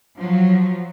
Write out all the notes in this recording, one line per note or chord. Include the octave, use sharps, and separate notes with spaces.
F3 F#3